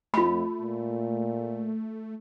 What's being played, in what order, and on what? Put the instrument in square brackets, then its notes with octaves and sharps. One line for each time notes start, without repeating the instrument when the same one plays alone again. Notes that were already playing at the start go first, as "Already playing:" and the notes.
[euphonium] F2 [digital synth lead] A3 [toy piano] F4 B5
[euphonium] A#2